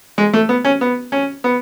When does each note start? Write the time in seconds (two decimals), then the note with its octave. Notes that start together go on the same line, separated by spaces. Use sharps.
0.18 G#3
0.33 A3
0.49 B3
0.65 C#4
0.81 B3
1.12 C#4
1.44 B3